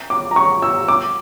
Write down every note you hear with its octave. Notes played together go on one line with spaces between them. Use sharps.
D6
A#5
C#6
E6
D6